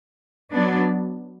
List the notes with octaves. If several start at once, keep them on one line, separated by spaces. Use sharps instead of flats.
F#3 B3 D4